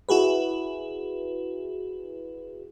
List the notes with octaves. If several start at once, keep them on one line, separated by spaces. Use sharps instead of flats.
E4 F#4 G#4 B4